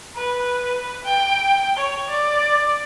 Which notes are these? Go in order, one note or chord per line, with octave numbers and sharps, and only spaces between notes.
B4
B4
G5
C#5
D5